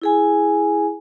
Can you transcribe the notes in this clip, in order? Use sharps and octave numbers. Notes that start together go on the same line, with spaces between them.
E4 G#4 G#5